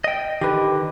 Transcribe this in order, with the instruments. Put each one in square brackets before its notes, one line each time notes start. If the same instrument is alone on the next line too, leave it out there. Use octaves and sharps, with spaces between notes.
[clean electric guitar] D#5 G5
[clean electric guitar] D3 D#3 [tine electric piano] G4 B4